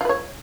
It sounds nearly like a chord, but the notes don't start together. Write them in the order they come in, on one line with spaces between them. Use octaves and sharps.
F4 B4 C#5